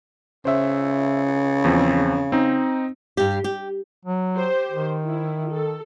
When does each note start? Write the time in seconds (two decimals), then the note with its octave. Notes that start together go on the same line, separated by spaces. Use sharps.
0.45 C#3 C5 E5
1.64 E2 F3 C4
2.32 C4 D#4
3.17 G2 G4
3.44 G4
4.05 F#3
4.35 G4 C5
4.72 D#3
5.05 E4
5.51 A4